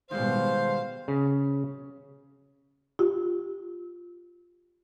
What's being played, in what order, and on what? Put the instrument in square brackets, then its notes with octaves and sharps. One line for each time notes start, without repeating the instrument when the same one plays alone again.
[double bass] B2 G3 [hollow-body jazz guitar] D#3 G#3 B3 [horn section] C5 [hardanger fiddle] F5
[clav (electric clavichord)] C#3
[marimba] F4 G4